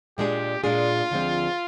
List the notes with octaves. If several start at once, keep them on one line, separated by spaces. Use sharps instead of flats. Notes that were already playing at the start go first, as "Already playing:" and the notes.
A#2 G#3 D4 G4 G#4
A#2 G#3 D4 F4 G#4
D2 D3 F3 G#3 C4